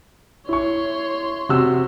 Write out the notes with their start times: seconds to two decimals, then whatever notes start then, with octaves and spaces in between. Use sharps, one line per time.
0.49 E4 C#5 C6 C#6
1.49 C3 F#4 E6